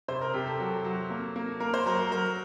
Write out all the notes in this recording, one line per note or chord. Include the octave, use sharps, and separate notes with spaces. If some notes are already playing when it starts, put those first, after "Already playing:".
C3 C5
A#4
C3 G4
A4
F#3
F#3
A#3
A#3
A#3 A#4
C5
F#3 A#4
A#4
F#3 A#4